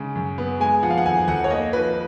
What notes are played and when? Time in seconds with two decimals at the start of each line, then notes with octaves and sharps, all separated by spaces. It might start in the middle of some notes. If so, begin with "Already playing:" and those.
Already playing: C#3 G#3
0.15 F#2
0.38 B3
0.60 G#3 G#5
0.83 F3 F#5
0.90 F5
0.98 F#5
1.06 F2 G#5
1.28 F2 F#5
1.44 C#5
1.51 A#3 D#5
1.73 F3 B4